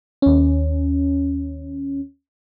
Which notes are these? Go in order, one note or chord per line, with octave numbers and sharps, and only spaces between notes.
D#2 C#4